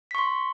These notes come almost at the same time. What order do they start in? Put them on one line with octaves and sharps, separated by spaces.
B6 C#6 C6